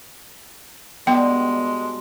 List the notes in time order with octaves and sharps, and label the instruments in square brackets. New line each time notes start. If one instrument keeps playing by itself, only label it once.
[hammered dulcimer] G2 B2 D4 [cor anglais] G#3 [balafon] B3 G5